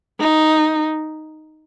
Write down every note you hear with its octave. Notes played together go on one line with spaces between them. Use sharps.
D#4